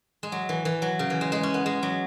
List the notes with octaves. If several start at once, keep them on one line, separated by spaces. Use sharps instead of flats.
G#3
F#3
E3
E3
F#3
C#3
E3
G#3
G#3
C#4
B3
G#3
F#3